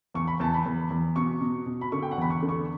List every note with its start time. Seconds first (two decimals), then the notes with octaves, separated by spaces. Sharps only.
0.14 E2 C#6
0.28 B5
0.40 E2 A5
0.54 B5
0.66 E2
0.91 E2
1.16 B2 C#6
1.41 B2
1.66 B2
1.81 B5
1.92 D3 C#6
2.02 G5
2.11 F#5
2.18 E2 B5
2.30 C#6
2.43 D3
2.49 C#6